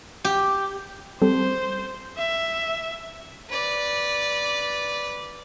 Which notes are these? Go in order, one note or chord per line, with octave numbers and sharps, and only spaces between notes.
G4
G3 C4 A4 C5
E5
B4 D5